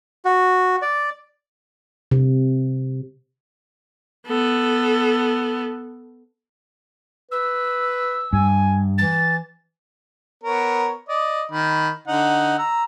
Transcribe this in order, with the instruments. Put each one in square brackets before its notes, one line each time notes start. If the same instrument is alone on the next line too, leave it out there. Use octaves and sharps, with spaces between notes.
[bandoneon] F#4
D5
[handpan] C3
[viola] B3 A4
[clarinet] B4 [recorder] E6
[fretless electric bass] G2 [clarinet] G#5
[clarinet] E3 [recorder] A6
[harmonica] B3 A#4 C#5
D5 D#5
D#3 B5
D3 D#4 F#5
A#5 E6